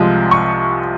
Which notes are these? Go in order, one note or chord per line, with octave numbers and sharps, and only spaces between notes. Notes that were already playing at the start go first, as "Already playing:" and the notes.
Already playing: C2 C3 F3 G#3
C#6